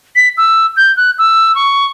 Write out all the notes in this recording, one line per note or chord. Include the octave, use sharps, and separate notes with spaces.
B6
E6
G6
F#6
E6
C#6